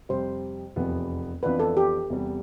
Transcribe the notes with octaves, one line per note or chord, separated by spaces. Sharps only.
F2 C3 G3 C5
F1 E2 C3 F3 B3
F2 E3 B3 D4 F4 B4
A4
G4
E2 C3 G3